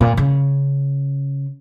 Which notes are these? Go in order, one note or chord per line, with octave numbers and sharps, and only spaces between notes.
A#2
C#3